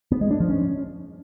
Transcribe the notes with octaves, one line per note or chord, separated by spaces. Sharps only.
B3
G#3
D4
F3
C#4